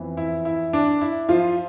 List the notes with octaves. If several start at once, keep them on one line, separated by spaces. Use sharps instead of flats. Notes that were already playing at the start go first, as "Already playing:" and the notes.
Already playing: F2 E3 B3
E4
E4
D4
E4
F3 F4